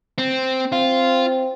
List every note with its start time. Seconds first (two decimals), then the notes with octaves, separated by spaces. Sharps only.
0.18 C4
0.72 C4 F4